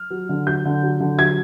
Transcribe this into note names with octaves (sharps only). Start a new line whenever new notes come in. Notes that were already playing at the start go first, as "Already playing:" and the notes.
Already playing: F6
F#3
D3
F#3 G6
D3
F#3
D3
F#3 G#6